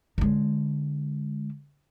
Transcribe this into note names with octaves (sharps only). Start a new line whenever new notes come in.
D3 G#3